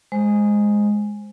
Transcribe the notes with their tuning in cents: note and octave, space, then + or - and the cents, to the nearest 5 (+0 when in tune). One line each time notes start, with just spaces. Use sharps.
G#3 +0 C5 +5